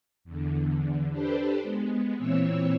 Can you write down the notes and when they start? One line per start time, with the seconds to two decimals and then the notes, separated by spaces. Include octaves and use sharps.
0.24 E2 D3
1.12 D4 G4 A4 B4 C5
1.63 G#3 B3
2.16 A#2 E3 C4 C#5 E6